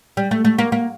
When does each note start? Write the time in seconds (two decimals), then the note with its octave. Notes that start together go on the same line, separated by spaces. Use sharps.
0.17 G3
0.31 A3
0.45 A3
0.58 A#3
0.72 A#3